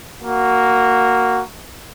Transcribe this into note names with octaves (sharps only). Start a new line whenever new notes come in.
A#3 F#4